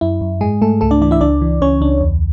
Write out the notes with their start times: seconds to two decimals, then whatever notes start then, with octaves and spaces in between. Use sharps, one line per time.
0.01 F#2 E4
0.21 F#2
0.41 G#2 G#3 G#4
0.62 G#2 A3 A4
0.81 C#2 A3 A4
0.91 D4 D5
1.01 E3 D4 D5
1.11 E4 E5
1.21 C#2 D4 D5
1.42 E3
1.61 C#2 C#4 C#5
1.81 C#2 D4
2.01 E2